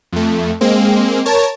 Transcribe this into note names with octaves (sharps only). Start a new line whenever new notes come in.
F2 A3
G#3 A#3 C4
A#4 C#5 A5